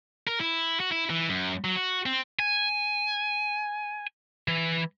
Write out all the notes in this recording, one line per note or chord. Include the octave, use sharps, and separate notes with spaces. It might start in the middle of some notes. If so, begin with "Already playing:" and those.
A#4
E4
F#4
E4
E3
F#2
F#3
F#4
C4
G#5
E3